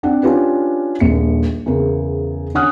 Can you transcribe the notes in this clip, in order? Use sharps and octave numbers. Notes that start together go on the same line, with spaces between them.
C4 D4 F#5
C#4 D4 F4 G4 B4
D#1 A#1 C#7
E2 C#3 A#4
D3 C#4 F#5 D#6 F6 F#6